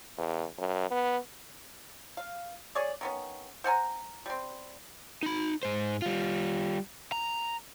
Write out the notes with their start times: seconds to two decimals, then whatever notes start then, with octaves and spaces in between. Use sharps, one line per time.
0.18 E2
0.58 F#2
0.91 B3
2.17 F5
2.75 G#4 C#5 D5
3.01 D#3 B3 C#4
3.64 C5 F#5 G#5 A#5
4.26 G3 C4
5.23 D#4 B5
5.63 G#2 C5
6.02 G3 F4
7.12 A#5